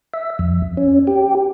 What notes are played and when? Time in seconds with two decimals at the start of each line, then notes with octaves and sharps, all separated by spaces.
0.14 E5
0.39 F2
0.77 C#4
1.07 G4